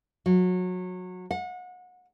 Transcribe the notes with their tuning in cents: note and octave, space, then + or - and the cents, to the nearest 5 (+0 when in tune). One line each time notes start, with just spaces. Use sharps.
F#3 -25
F#5 -30